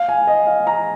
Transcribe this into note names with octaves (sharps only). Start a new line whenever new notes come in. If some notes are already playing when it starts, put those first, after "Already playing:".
Already playing: F5
G#5
D#5
F5
A#5